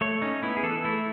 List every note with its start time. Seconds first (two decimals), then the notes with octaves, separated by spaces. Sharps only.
0.01 A3 C#5
0.22 C#4 D#4
0.43 B3 E4
0.57 G#4
0.63 E3 A4
0.84 A3 E4